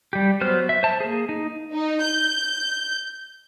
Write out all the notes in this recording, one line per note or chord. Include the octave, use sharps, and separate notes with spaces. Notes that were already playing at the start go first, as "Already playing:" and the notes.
G3 G4
F#3 B3 C5 F6
E5
C5 A5
A#3 G#4
D#4
D#4
G6